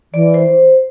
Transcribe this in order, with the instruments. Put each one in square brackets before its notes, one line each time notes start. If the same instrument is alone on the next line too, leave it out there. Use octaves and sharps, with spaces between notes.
[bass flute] E3 [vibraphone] D5
[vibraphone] C5